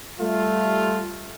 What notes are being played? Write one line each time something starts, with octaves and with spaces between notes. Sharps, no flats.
G3 A3 F4